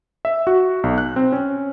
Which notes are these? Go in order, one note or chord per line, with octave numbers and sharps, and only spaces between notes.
E5
F#4
B1
F#6
C4
C#4